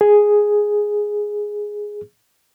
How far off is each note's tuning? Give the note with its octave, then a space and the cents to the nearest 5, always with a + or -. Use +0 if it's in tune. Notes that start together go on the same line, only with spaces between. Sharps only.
G#4 +0